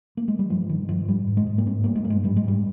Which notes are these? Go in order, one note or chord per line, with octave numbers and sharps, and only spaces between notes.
A#3
G#3
G3
G2 F3
G2 D#3
G2 F3
G#2 G3
G#2
G#3
G#2
A#3
G2 C4
G2 A#3
G#3
G2 A#3
G#3
G#2 G3
G#3
G#2 G3